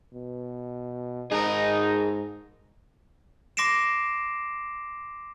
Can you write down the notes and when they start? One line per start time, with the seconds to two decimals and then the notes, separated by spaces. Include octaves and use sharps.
0.14 B2
1.32 G#2 D#4 G#4 A#4
3.57 C6 D6 A#6 C7 D7 E7